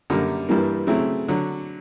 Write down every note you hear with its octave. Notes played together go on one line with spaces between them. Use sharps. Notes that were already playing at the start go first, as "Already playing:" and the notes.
F#2 D3 G3 A#3
G2 E3 G3 A#3
C#3 F#3 A3 C4 E4
D3 F#3